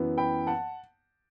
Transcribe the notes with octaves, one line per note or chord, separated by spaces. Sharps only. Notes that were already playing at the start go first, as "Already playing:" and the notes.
Already playing: F#2 E3 B3
G5 B5
F#5 A5